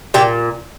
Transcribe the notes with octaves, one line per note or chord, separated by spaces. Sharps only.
A#2 G4